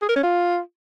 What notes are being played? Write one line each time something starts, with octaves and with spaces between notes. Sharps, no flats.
G#4
A#4
C#4
F4